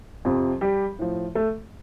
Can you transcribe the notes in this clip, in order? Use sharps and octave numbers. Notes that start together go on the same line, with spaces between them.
F2 C3 F3
G3 G4
A2 F3
A3 A4